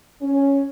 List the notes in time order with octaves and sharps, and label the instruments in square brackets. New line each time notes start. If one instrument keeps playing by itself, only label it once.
[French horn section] C#4